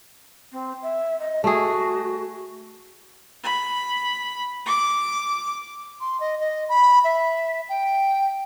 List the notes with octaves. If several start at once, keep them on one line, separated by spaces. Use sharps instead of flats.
C4
E5
D#5
A3 F#4 G#4
B5
D6
C6
D#5
D#5
B5
E5
G5